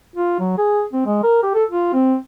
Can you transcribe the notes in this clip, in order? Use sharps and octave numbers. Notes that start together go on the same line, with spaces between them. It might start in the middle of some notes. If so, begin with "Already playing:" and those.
F4
F#3
G#4
C4
G#3
A#4
G4
A4
F4
C4